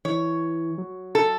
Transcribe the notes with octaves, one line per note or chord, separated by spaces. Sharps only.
E3 C#5
F#3
A4